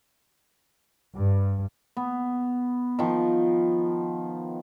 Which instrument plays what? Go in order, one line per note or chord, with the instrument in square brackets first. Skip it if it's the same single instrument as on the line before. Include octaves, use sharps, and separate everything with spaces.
[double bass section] G2
[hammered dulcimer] B3
D#3 F3